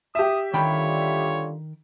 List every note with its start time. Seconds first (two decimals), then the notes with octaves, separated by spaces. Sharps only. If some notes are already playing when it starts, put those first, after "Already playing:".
0.15 G4 E5 D#6
0.54 D3 D#3 G3 F4 C#5 G5 B5